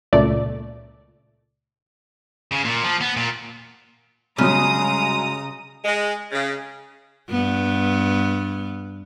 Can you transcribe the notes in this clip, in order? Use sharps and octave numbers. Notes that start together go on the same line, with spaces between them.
C#2 A#2 A3 D5
C#3
A#2
F3
B3
A#2
G2 C#3 F#3 G#3 A#5 D#6
G#3
C#3
G2 B3